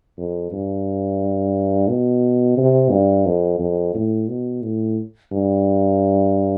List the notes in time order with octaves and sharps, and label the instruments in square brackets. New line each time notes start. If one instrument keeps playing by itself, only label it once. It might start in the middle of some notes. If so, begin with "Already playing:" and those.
[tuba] F2
G2
B2
C3
G2
F2
F2
A2
B2
A2
G2